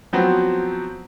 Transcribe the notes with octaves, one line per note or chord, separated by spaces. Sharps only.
F3 F#3 B3 C4